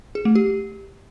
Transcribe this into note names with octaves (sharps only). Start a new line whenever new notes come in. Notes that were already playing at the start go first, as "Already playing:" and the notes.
G#4
A3
G4